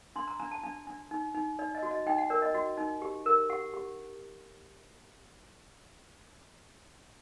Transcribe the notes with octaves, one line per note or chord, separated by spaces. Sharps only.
D4 C6
A#5
D4 A#5
A5
D4
D4
D#4
D#4
D#4 D5
D#5
F#4
D#5
D#4 G5
F#5
A#4 D5
D#5
F#4 D#5
D#4
G4
A#4
G4 F#5
G4